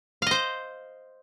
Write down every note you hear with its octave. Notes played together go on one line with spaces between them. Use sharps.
C5 D#5 F5